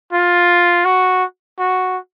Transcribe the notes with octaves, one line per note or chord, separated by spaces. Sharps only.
F4
F#4
F#4